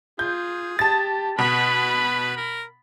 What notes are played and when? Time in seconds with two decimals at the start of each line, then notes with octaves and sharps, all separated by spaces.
0.19 F4 G#4 G6
0.79 G4 A5 A6
1.39 B2 B4 B5
2.37 A#4